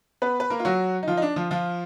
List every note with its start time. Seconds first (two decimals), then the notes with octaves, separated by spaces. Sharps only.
0.22 B3 B4
0.40 B4
0.50 A#3 A#4
0.59 F4
0.65 F#3 F#4
1.03 D#4
1.08 F3 F4
1.17 D#4
1.22 D4
1.36 F3 F4
1.51 F3 F4